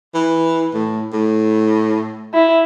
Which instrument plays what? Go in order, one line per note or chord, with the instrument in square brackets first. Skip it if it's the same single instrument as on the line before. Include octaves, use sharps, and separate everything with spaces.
[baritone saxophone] E3
A2
A2
[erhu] E4